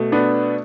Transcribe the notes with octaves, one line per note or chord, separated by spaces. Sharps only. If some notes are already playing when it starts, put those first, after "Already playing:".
Already playing: B2 A3
B3 D4